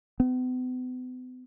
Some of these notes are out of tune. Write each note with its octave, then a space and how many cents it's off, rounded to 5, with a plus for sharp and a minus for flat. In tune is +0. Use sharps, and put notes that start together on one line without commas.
B3 +40